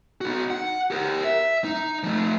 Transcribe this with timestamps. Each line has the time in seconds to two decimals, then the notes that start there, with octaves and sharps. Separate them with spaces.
0.21 D#4 F#4
0.50 F#5
0.91 G4 A#4
1.24 E5
1.64 D#4
2.03 F3 A3